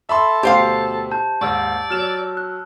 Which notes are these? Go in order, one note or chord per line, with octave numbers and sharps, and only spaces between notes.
A4 E5 B5 C6
D2 B2 G4 C5 F5
A5 G6
D#2 G#2 D5 C#6 E6
F#3 F6 E7
F#6